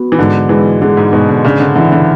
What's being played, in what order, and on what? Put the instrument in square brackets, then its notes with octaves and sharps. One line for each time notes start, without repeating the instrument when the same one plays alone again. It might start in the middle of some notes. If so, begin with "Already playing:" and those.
Already playing: [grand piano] B3 F#4
[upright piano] E3
[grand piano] G#2 [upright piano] D3
[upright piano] E3 [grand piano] G#3
[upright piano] D3 [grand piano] G#3
[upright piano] G#2
[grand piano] G#2 [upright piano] B2
[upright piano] D3
[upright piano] C#3 [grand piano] D4
[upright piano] D3
[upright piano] D3 [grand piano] E3
[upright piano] D3